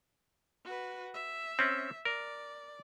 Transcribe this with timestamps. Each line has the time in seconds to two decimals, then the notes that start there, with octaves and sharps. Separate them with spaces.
0.65 F#4 B4
1.14 E5
1.59 C4 C#4
2.05 A#4 D5